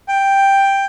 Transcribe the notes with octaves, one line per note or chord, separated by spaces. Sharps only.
G5